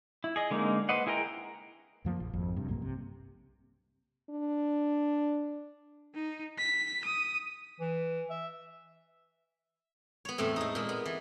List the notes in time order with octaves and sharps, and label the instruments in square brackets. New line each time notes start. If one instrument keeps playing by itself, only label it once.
[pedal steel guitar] E4
G#4 D#5
D3 G#3 A#3 C4 D#4
B4 C5 D#5 F#5
E4 G#4 A#4 G5 A#5
[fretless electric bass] F#2 F3 G3 A#3
A#1
G#1 F2
G2 C3
B1 G2 A#3
C3
[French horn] D4
[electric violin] D#4
B6
D#6
[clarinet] E3
E5
[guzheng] B3 C#5
E2 A2 A3 C4
G#3 D#4
A#2 G#3
B3
E3